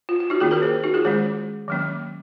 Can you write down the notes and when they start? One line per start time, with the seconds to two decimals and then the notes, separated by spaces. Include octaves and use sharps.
0.09 F4
0.20 F4
0.30 D#4 F#4
0.40 D#3 A#3 C#4 F4 G#4
0.51 F#4 A#4
0.62 G#4 C5
0.84 D#4 F#4
0.94 F4 G#4
1.04 D#3 G#3 C#4 G#4 C5
1.68 D#3 F#3 A#3 C#4